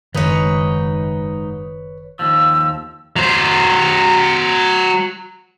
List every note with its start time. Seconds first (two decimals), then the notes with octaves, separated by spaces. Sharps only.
0.14 F#1 G#2 D#3 D#4 B4 C#5
2.19 D#2 F3 E6
3.16 F#3 C5